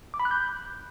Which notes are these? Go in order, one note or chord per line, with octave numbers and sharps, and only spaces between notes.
D6
B5
F#6
G6